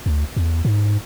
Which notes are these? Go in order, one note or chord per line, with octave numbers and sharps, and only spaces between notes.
D2
E2
G#2